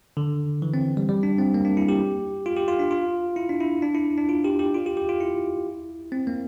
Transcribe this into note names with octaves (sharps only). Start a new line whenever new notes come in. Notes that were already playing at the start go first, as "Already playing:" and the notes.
D3
E3
C4
G3
G3
D4
C4
A#3
D4
E4
G4
F4
G4
F4
D4
F4
E4
D4
E4
D4
E4
D4
F4
G4
G4
F4
G4
G4
F4
E4
C4
A#3